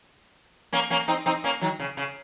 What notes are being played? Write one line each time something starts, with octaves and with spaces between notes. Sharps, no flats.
A#3 C#4
A#3 C#4
C4 D#4
C4 D#4
A#3 C#4
D#3 F#3
C#3
C#3